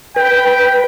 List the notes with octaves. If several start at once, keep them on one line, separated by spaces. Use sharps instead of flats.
B4 G5